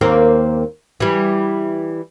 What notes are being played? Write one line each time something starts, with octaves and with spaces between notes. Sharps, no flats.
D#2 A#3 C4
E3 G3